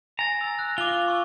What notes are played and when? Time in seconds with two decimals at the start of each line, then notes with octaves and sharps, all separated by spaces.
0.19 G#5 A#5 A6
0.41 E6 A6
0.59 F#6
0.78 F4 D6 G7
1.08 C#6 E6